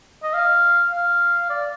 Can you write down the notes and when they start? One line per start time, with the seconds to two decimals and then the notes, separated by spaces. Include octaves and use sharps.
0.23 D#5
0.34 F5
0.92 F5
1.50 D5